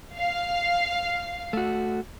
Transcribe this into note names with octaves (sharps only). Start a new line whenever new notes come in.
F5
A3 F#4